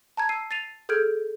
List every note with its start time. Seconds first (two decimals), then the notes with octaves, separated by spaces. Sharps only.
0.17 A5 A#5 G#6
0.29 E6 C7 D#7
0.51 A6 C7 D#7 F7
0.89 G#4 A4 F6 G6 G#6 D7